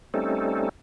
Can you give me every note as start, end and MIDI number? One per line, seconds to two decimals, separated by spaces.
0.14 0.69 55
0.14 0.69 57
0.14 0.69 60
0.14 0.69 61
0.14 0.69 63
0.14 0.69 69